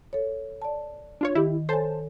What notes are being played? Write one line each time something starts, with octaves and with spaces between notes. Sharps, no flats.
A4 C#5
D5 A5
D4 F4 C#5
D#3 E4 G4
A4 C5 C#5 G#5 A5